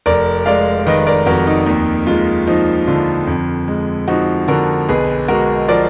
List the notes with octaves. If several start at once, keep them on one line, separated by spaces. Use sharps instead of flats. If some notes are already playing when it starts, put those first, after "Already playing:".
F1 A#4 D5
G#3 D5 F5
D#3 B4 D#5
A#4 D5
F2 F#4 A#4
D#4
D#2 D#4
G#3 F4
F3 D#4
D3 F4
F2
G#3
F3 D#4 F#4
D3 F#4 A#4
B1 G#4 B4
G#3 F#4 A#4
F3 A#4 D5